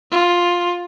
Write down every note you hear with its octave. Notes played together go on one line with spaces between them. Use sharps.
F4